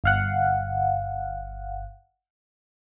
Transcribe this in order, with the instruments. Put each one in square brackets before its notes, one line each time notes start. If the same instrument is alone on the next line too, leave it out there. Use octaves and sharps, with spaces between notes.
[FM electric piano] G1 F5 F#5